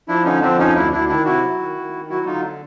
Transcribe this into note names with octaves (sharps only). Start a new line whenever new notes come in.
F3 D4 E4
D3 C#4 D#4
F3 C4 D4
F2 C#4 D#4
D2 D4 E4
D2 D4 E4
D#3 D4 E4
C3 E4 F#4
F#3
D#3
D#3
D#3
F#3 E4 F#4
D3 D#4 F4